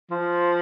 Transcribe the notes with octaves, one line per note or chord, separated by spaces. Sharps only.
F3